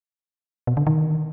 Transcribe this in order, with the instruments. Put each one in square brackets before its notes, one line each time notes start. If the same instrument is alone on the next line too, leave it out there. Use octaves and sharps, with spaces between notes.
[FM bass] B2
D3
D#3